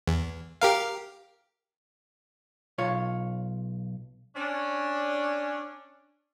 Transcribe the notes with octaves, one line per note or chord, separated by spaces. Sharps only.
E2
G4 A#4 F5
B1 F4 C#5
C#4 D4